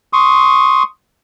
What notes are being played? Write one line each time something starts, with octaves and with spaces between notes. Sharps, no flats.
C6 C#6 D#6